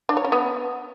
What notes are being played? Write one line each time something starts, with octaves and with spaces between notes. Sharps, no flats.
D4
C#5
C#4
B3